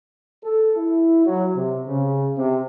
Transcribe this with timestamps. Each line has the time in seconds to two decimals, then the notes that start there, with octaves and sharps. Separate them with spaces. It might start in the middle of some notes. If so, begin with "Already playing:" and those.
0.44 A4
0.77 E4
1.26 F#3
1.55 C3
1.87 C#3
2.37 C3